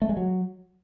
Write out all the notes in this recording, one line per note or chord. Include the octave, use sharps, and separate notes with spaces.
A3
G#3
F#3